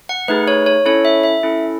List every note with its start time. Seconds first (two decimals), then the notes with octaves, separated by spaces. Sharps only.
0.09 F#5
0.28 A3 D#4 G#4 B4
0.48 C#5
0.66 C#5
0.86 C#4 E4 A4 C#5
1.05 E5
1.23 E5
1.43 C#4 E4 A4